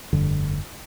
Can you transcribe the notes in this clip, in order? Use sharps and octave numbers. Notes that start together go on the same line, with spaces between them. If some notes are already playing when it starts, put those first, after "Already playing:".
F1 G2 D3